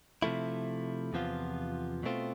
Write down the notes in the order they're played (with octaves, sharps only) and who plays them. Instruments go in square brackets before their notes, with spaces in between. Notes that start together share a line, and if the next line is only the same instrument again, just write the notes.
[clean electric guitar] C3 F3 A3 E4
E2 C3 F3 B3 F4
B2 A3 C4 F4